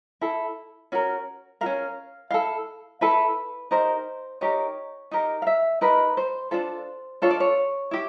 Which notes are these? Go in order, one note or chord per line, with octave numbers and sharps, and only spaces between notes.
E4 A4
C#4 F#4 A#4
F#4 A#4 F5
C#4
E4 A4 F5
E4 A4 B4
D#4 G4 A#4 C5
D#4 G4 A#4 C#5
D#4 G4 A#4
F5
E5
D#4 G4 A#4 B4
C5
D4 F4 A4 C5
D4 F4 A4 C#5
D5
C#5
E4 G4